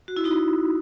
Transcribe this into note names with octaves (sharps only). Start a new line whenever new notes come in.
F#4
E4
D#4 F#4